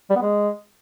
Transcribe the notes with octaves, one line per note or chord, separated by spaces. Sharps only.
G3
B3
G#3